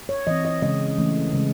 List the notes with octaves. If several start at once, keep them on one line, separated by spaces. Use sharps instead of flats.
C#5
E3 C4 D#5
D#5
C#3 E3 G#3 C#4 D#5
E3 A3 C#4
C#3 G#3 C#4